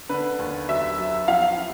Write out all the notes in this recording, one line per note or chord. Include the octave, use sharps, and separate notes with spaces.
D3 B4
D#2
F#3 E5
F#3
F3 F5
F3